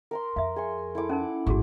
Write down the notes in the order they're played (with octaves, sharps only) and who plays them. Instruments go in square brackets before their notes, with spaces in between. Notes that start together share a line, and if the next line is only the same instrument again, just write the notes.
[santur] A#4 A#5 C6
[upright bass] F2 [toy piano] E5 F5
[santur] G#4 C6 C#6
E4 A4 D6
[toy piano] C#4 D#4 A#4 [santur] F#5
[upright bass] G#1 A2 [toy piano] F#4 G#4 C#6